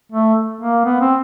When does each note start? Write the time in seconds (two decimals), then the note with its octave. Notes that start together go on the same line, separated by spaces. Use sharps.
0.12 A3
0.61 A#3
0.85 B3
1.01 C4